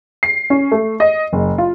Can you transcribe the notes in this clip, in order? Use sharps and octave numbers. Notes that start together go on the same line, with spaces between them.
C7
C#4
A3
D#5
F#1
F4